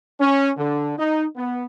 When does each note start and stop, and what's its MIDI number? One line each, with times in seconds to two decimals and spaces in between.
0.20 0.51 61
0.57 0.94 50
0.99 1.25 63
1.36 1.65 59